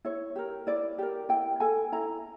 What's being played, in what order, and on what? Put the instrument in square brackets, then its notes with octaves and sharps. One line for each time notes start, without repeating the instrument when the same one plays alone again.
[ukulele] E4 C#5
G4 A#4
E4 D5
G4 A#4
E4 G5
A4 G#5
E4 A#5